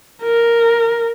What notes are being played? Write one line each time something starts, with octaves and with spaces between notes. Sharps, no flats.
A#4